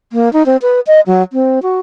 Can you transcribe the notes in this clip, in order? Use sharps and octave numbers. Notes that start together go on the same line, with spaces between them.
A#3
D#4
C4
B4
D#5
F#3
C4
F#4